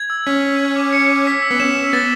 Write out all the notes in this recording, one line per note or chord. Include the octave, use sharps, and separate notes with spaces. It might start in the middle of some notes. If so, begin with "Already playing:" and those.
Already playing: G#6
E6
C#4 B6
E6
G#6
D6
C#7
D6
B6
E6
B3
C#4 E7
E6
B3 A6